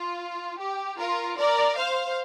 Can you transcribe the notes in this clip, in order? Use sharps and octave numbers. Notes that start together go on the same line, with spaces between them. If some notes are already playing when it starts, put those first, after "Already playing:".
Already playing: F4
G4
F4 A#4
A#4 D5
C5 F5